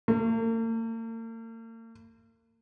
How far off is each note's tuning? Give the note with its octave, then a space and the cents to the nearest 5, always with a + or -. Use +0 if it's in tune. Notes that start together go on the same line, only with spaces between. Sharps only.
A#3 -45